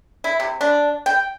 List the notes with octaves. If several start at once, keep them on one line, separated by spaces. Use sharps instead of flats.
E4
C3
D4
G5